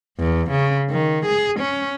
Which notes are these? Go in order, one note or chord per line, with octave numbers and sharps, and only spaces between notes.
E2
C#3
D#3
G#4
C#4